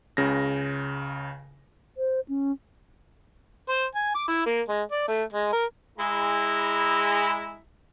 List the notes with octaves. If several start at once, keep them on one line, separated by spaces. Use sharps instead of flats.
C#2 C#3 A#6
C5
C#4
C5
G#5
D6
E4
A#3
G#3
D5
A3
G#3
A#4
G#3 E4 A#5